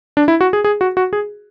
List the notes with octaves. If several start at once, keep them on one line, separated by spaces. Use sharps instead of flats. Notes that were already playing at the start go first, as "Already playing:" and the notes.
D4
E4
F#4
G#4
G#4
F#4
F#4
G#4